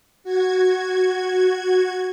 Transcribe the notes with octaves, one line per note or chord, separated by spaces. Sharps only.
F#4 G#6